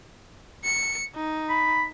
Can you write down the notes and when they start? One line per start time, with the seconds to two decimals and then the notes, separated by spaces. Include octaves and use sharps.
0.64 C#7
1.15 D#4
1.49 B5